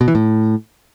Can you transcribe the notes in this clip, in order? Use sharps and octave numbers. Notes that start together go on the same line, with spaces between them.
B2
E3
A2